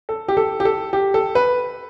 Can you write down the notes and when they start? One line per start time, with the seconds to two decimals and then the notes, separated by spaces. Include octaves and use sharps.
0.09 A4
0.28 G4
0.37 A4
0.60 G4
0.65 A4
0.93 G4
1.14 A4
1.35 B4